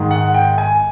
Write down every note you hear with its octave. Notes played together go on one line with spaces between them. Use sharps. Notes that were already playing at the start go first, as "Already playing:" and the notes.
Already playing: G#2 D#3 G#3
F#5
G5
G#5